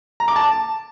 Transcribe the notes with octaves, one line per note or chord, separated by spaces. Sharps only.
A#5
D6
A5